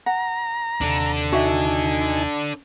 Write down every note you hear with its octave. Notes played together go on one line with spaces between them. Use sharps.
F#5 A#5
D#2 C3 D4 A4
D#4 F#4 E5 G#5